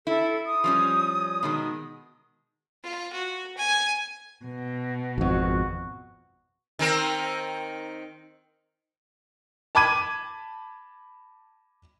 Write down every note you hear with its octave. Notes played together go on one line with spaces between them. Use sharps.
E4 A4
D#6
F3 G3 C#4
B2 D#3 G#3
F4
F#4
G#5
B2
G#1 F2 F#4
D#3 C4 A#4
A5 B5 D6 G#6 D#7